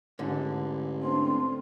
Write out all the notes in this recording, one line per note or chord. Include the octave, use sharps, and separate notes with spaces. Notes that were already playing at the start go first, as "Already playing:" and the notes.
A1 G#2 D3
A3 C4 D4 C6